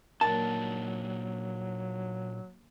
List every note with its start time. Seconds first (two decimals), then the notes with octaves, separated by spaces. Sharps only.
0.21 A#2 F#3 A#3 D4 D#4 A#4 A5